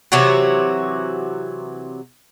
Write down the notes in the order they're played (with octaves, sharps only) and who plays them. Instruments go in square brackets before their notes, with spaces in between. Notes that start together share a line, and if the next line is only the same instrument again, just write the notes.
[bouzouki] C3 E3 F#3 F#4